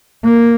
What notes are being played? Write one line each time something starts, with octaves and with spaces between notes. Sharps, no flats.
A#3